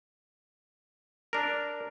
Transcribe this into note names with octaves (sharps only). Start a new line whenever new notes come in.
D4 A#4